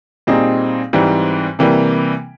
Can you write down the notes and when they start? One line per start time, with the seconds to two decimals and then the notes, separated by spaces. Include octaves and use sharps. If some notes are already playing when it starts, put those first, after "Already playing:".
0.27 A#2 G3 C4 D#4 G#4
0.93 G#2 E3 G3 C4
1.59 C3 E3 G3 A#3